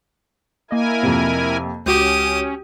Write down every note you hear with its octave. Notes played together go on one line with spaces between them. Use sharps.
A#3 E4 A#4 D#5 G#5
F2 C3
C#2 C#4 F#4 G4 D6 D#6 G6